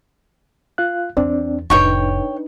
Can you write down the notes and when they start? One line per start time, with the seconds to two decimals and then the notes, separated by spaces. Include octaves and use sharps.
0.78 F4 F5 F#6
1.17 E2 C4 D4 D5
1.70 F1 A2 D4 D#4 B4 C#5 G5 C#6